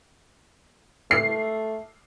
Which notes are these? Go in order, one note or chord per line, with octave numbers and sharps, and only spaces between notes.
A3 C7